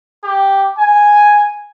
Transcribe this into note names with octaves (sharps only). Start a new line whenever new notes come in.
G4
G#5